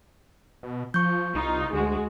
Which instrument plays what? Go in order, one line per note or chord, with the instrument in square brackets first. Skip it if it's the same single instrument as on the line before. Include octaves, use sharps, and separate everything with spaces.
[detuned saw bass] B2
[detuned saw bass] F3 [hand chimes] C#6 G6
[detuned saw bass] C2 [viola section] D#4 F4
[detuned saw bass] D2 [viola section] G#3 F#4